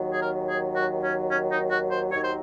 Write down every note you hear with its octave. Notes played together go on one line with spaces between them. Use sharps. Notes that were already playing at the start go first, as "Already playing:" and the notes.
Already playing: D#2 D#3 F#3
G#4
A#4
G#4
F#4
C#4
C#4
D#4
F#4
C5
D#2 D#3 F#3 C#5
C5